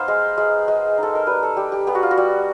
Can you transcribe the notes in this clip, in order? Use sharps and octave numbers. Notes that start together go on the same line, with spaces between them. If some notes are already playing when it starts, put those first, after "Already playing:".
Already playing: B3 D#4 C5 F5
G#3
G#3
G#3
D#4 A4
A#4
G3 B4
A4
G3 G4
G4
B3 G4
F#4
F4
F#4
G3